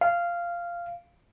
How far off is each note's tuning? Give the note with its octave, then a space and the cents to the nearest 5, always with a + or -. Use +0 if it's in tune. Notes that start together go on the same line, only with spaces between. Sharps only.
F5 -10